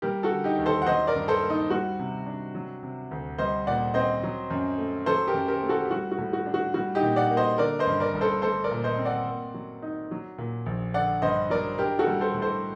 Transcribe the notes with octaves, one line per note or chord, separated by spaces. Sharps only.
G3 G4 A#4
F#4 A4
D3
D#4 G4
D#2
A4 C5
F#5
F#3 C5 D#5
A#4 D5
G2
A4 C5
A#3
D#4
G3 F#4
C3
D4
F#3
C3
D2
G3 C5 D#5
A#2 D5 F#5
C4 C5 D#5
F#3
F#2
A3
F#3 A4 C5
G4 A#4
F#2
G4 A#4
A3
F#4 A4
G4
G3 F#4
F#4
A2
F#4
D4
F#4
G3 F#4
D#4 G4
A#2
D5 F#5
A#3
C5 D#5
D3 A#4 D5
C5 D#5
G2
A#4 D5
G1
A4 C5
A3 A4 C5
A#4 D5
A#2
C5 D#5
C4
D5 F#5
A#3
F#3
D#4
F#3
A#2
A#1
D3 D5 F#5
G2 C5 D#5
F#3 A#4 D5
D4 G4 A#4
F#4 A4
G3
A4 C5
A2
A4 C5